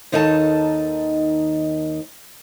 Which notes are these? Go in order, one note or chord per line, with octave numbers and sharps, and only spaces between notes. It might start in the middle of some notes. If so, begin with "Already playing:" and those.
D#2 D#3 D#4 A4 A#4 A5